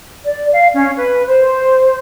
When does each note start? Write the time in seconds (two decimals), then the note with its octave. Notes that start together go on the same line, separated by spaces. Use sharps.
0.24 D5
0.53 F5
0.74 C#4
0.96 B4
1.27 C5